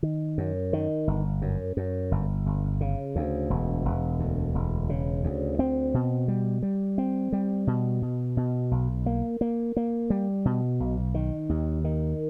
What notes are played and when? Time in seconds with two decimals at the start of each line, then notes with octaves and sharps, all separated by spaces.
0.03 D#3
0.38 F#2
0.73 D#3
1.07 G1
1.42 F#2
1.77 F#2
2.11 G1
2.46 G1
2.81 C#3
3.16 D2
3.50 E1
3.85 E1
4.20 D2
4.55 E1
4.89 C#3
5.24 D2
5.59 C4
5.94 B2
6.28 G3
6.63 G3
6.98 C4
7.33 G3
7.67 B2
8.02 B2
8.37 B2
8.71 B1
9.06 A#3
9.41 A#3
9.77 A#3
10.10 G3
10.45 B2
10.80 B1
11.14 D#3
11.49 D#2
11.84 D#3